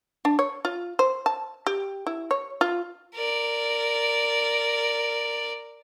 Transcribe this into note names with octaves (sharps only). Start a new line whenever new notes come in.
D4
C#5
F4
C5
A5
G4
E4
C#5
F4
A#4 D5